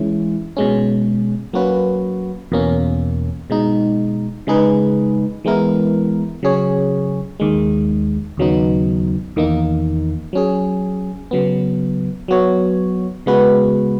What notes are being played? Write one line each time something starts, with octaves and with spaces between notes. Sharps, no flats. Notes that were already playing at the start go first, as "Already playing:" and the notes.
Already playing: E3 G#3 C#4 E4
B2 G#3 C#4
F#3 A#3 C#4 F#4 B4
E2 B2 A#3 C#4
B2 G#3 D#4
C#3 G#3 D#4 G#4 B4
E3 G#3 B3 E4 A#4
C#3 F#3 C#4 G#4 C#5
D#2 D#3 G#3
D#2 C#3 F#3 B3 D#4
E2 D#3 A#3 D#4
F#3 C#4 G#4
C#3 F#3 B3
F#3 B3 F#4 C#5
C#3 G#3 B3 F#4 B4